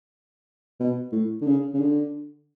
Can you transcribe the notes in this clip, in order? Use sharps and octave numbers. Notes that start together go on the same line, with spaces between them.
B2
A2
D3
C#3
C#3
D3